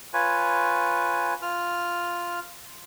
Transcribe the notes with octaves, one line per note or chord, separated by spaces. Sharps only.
F4 B4 C#5 G#5
F4 F6